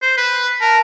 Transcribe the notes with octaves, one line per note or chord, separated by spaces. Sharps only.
C5
B4
A#4 A5